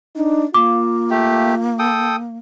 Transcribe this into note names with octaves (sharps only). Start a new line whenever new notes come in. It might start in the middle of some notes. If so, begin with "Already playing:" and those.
D4 D#4
A#3 F4 D6
A3 G4
A4 G5 D#6